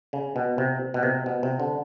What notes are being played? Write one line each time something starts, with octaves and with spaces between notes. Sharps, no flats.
C#3
B2
C3
B2
C3
B2
C3
D3